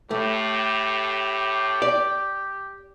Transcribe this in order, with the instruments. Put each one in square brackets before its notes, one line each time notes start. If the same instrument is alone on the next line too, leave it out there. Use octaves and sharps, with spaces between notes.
[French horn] A2 [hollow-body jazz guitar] A3 [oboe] G4
[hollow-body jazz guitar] D5